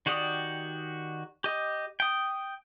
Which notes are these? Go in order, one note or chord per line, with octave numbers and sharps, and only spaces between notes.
D#3 F#4 G4 D5 D#6
G4 D#5
G5 D#6